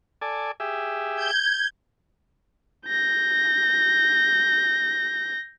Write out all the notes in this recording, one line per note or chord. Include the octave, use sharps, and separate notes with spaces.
A4 D5 G#5
G4 G#4 E5
G6 G#6
G6 A#6